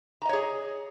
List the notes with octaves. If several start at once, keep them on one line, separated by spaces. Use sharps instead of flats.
G#4 C#5 D#5 A#5